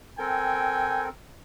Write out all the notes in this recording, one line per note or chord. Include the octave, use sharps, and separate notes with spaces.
C4 A4 A#4 G5 G#5